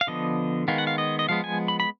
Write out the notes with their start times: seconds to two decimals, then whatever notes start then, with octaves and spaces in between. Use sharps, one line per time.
0.01 F5
0.07 D3 F3 B3 D#5
0.68 D#3 G#3 B3 F5
0.78 F#5
0.87 F5
0.98 D#5
1.19 D#5
1.29 F3 G#3 B3 F5
1.44 G#5
1.68 B5
1.80 B5